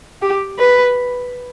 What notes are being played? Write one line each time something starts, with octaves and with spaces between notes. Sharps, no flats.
G4
B4